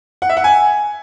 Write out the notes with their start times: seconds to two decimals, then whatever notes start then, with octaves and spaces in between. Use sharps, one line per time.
0.22 F#5
0.29 E5
0.37 F#5
0.44 G#5